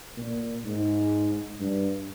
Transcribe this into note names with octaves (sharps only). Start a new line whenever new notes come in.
A#2
G#2
G2